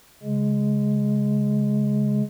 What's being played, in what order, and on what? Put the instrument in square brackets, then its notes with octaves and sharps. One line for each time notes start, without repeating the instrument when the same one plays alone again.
[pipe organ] C#3 G#3